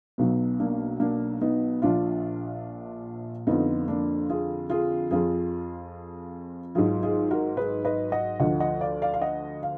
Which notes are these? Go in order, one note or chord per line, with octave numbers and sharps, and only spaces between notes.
B1 B2 F#3 B3
A#3 D4
A#3 D4
B3 D#4
A#1 A#2 F3 D4 F4
F2 D3 F3 B3 D#4
A#3 D4
F4 G#4
F4 G#4
F2 F3 F4 G#4
G#1 G#2 F#3 F4 G#4
F4 G#4
F#4 A#4
G#4 B4
B4 D#5
D#5 F#5
D2 D3 F3 D#5 F#5
D#5 F#5
D5 F5
D5 F5
F5
D#5 F#5
F5